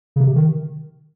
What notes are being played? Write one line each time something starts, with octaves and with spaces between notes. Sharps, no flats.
C#3
C3
D#3